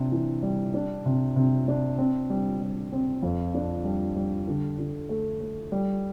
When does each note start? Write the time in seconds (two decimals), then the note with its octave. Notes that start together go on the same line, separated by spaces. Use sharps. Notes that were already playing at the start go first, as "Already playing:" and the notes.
Already playing: C3 D4
0.12 E3
0.43 G3
0.74 D4
1.05 C3
1.36 C3
1.68 D4
1.98 C4
2.30 G3
2.61 G3
2.92 C4
3.23 F2
3.54 D4
3.85 G3
4.16 G3
4.47 D3
4.78 D3
5.09 A3
5.40 A3
5.72 G3